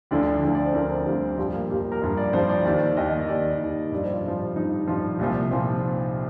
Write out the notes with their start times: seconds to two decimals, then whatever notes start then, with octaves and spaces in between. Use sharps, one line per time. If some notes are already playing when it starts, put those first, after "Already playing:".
0.11 D2 D3 F3 D5
0.43 D2 D3 F3
0.55 D5
0.65 C5
0.74 D2 D3 F3 A#4
0.91 C4
1.06 D2 D3 F3 G3
1.38 G2 F3 G3
1.54 A#3
1.70 G2 F3 G4
1.92 A#4
2.02 G2 F3
2.17 D5
2.33 G2 F3 C5
2.49 D5
2.65 D#2 D#3 D5
2.97 D#2 D#3 D#5
3.29 D#2 D#3 D5
3.60 D#2 D#3
3.92 G2 F3 D5
4.03 C5
4.13 F4
4.24 G2 F3 F4
4.56 G2 F3 D#4
4.88 G2 F3
5.19 C2 A#2 F3
5.51 A#2 F3 C4